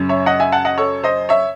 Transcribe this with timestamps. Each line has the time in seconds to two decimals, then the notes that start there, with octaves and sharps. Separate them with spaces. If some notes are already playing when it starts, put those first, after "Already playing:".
Already playing: F#2 C#3 F#3 C#4
0.09 C#5 E5
0.26 D#5 F#5
0.40 E5 G#5
0.52 F#5 A5
0.65 D#5 F#5
0.78 A4 C#5
1.04 C5 D#5
1.29 C#5 E5